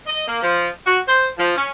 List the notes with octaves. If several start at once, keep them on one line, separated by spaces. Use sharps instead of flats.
D#5
A#3
F3
F#4
C5
F3
C#4